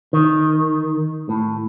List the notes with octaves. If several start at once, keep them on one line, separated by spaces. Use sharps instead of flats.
D#3
A2